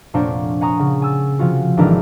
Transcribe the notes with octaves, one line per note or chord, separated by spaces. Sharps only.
F1 A#2 A#3 D4 C5 C#5
F#5 G#5 A#5 C#6 D#6
C#3
G#5 E6 A6
C3 F3 F4 F#4
G#1 E3 G#3 D4 E4 A#4